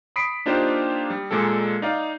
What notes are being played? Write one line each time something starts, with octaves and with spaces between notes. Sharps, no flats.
B5 D#6 B6 C7 D7
A#3 D4 D#4 F4 G4 C5
G3
A#2 G#3 A#3 A4
D#4 D5 F5